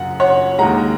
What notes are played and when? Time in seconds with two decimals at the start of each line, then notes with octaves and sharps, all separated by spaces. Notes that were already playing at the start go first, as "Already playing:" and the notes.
Already playing: F#2 C#3 F#5
0.20 C#5 F#5
0.59 D#2 D#3 G#3 F#5 A#5